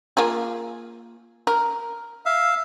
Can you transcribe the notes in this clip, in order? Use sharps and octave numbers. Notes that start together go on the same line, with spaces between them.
A#3 F4 G#4
A#4
E5 F5